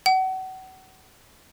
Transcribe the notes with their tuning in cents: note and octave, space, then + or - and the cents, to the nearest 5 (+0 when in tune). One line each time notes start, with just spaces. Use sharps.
F#5 +35